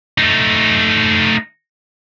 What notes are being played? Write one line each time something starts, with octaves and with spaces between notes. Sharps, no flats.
A3 D#4